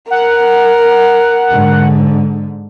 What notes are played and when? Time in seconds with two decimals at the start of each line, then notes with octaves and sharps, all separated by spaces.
0.11 A#4 F#5
1.50 G#2 D3